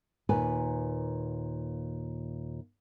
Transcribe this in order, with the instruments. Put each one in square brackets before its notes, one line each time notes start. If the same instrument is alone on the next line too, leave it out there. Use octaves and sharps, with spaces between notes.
[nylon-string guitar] D#2 A#2 B4 G#5